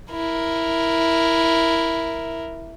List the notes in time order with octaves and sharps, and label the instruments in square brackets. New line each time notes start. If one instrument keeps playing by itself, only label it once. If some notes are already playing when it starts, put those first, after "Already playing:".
[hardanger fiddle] E4 A#4